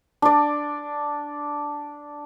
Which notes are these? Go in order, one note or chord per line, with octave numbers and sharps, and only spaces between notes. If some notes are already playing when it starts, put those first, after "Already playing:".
D4 D5